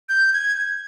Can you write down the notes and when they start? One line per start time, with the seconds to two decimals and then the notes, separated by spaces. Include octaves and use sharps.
0.09 G6
0.33 G#6